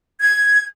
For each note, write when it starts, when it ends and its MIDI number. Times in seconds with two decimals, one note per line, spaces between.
0.20 0.66 92